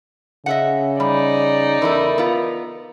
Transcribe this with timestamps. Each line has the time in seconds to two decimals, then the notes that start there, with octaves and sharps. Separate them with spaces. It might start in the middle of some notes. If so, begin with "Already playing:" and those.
0.46 C#3 D#5 E5 F#5
1.00 G3 D#4 D5
1.82 E2 E4 A4 A#4
2.18 B3 F4